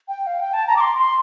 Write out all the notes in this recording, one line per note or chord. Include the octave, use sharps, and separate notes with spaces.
G5
F5
G5
A5
A#5
D6
C6
C6